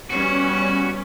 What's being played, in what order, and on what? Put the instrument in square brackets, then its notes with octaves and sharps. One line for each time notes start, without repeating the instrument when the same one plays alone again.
[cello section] G3 B3 C#4 [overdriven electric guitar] F#4